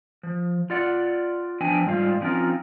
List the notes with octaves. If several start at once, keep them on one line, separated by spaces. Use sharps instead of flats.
F3
F4 D5 F#5
F3 B3 D4 G5 G#5
G#2 G3 F4 F5
F3 C4 C#4 D#4 F4 A#4